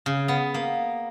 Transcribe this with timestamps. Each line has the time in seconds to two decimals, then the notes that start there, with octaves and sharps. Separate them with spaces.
0.06 C#3
0.28 B3
0.54 A#3